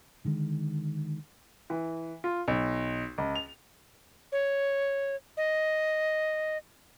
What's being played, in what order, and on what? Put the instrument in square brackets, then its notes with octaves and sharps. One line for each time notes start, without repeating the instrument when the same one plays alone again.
[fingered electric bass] D3 D#3 G#3
[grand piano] E3
F4
B1
C#2
F7
[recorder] C#5
D#5